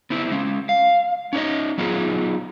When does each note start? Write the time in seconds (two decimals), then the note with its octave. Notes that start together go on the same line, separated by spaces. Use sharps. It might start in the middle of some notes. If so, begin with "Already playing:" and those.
0.10 B3 C4 E4
0.32 G#3 C#4
0.69 F5
1.33 C#4 D#4 C#5 D#5
1.78 F#3 B3 D#4 F4 G#4